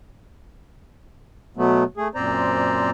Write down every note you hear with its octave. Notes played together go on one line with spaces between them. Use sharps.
B2 F#3 A3 B3
A3 G#4
F#2 A#2 C4 C5 D5 A#5